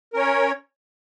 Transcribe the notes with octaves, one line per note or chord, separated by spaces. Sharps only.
C#4 A#4 C#5